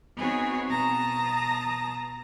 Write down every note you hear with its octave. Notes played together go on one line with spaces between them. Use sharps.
B3 C4 D#4 F#4 G#4 C#5
B2 A5 A#5 D#6 A#6